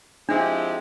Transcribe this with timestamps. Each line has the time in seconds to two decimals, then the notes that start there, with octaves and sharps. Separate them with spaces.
0.28 F3 G#3 C4 D4 E4 G4